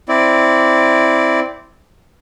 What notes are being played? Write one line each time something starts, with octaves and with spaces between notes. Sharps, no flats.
C4 E4 D5